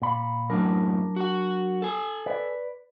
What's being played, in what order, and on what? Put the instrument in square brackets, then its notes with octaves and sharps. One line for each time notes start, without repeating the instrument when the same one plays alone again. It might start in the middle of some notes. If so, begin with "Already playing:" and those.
[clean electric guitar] A#2 B5
[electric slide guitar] F#2 A2 [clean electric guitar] F#3 D4 A#4
[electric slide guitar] F#4 F#5
A4 G#5
[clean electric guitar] B4 D5